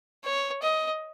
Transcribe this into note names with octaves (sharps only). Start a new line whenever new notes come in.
C#5
D#5